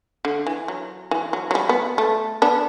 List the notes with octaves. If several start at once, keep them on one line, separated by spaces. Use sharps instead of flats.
D3
E3
F#3
E3
F#3
F#3
G3
B3
A3
B3 D4